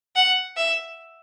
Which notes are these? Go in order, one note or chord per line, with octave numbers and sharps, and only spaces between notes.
F#5
E5